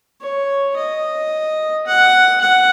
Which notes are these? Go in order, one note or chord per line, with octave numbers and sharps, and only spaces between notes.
C#5
D#5
F#5
F#5